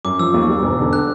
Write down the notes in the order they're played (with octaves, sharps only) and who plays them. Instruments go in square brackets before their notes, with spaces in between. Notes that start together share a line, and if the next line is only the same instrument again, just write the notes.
[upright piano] F#2 [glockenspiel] D6
[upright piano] F3 [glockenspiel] E6
[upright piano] D#2
G3
E1
D3
[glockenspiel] F#6